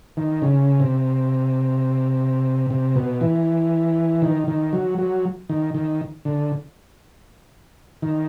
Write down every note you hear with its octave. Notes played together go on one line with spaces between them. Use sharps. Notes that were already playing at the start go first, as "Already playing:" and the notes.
D#3
C#3
C3
C3
B2
E3
D#3
D#3
F#3
F#3
D#3
D#3
D3
D#3